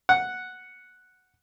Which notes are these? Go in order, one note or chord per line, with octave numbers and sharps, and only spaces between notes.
F#5